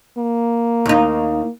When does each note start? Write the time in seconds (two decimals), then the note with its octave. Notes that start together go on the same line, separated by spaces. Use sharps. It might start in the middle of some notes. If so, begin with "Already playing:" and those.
0.18 A#3
0.86 D#2 D#4